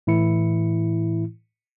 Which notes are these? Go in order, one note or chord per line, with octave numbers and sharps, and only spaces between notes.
A2 E3 E4 C#7